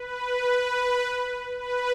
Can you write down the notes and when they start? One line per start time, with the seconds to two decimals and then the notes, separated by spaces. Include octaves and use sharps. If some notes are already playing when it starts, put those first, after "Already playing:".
Already playing: B4
1.60 B4